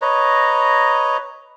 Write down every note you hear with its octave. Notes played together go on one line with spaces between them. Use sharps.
B4 C#5 D#5 A#5